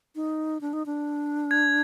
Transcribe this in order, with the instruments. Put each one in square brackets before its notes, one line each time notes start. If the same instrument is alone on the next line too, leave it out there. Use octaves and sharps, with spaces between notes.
[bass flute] D#4
D4
D#4
D4
[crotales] G#6